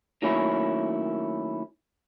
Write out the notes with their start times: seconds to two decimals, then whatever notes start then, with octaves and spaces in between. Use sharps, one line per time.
0.22 D#3 F#3 A3 A#3 C#4 E4